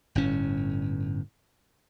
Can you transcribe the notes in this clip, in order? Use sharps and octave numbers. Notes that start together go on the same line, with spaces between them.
G1 A2 C#4